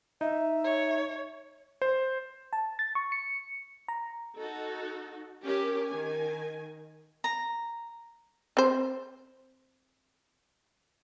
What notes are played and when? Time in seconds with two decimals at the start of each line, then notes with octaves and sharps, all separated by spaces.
0.21 D#4 E5
0.64 C#5
1.82 C5
2.53 A5
2.79 A6
2.95 C#6
3.12 C#7
3.88 A#5
4.37 D#4 F#4 A4
5.44 C#4 G4 A#4
5.89 D#3 G#5
7.24 A#5
8.57 C4 C5